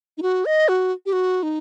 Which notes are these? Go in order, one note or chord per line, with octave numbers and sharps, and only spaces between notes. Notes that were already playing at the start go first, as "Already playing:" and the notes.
D#4
F#4
D#5
F#4
G4
F#4
D#4